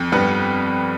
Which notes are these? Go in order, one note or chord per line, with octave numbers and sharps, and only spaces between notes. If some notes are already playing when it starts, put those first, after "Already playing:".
Already playing: F2
G2 B3 B4